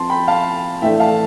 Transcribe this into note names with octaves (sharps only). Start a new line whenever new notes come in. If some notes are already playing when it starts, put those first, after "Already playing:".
Already playing: F3 C4 F4 A5 C6
G5 B5
F5 A5
A2 E3 A3 D4 E5 G5
F5 A5